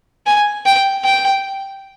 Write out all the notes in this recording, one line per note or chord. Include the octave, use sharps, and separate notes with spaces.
G#5
G5
G5